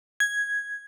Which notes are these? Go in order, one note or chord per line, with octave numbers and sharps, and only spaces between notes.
G#6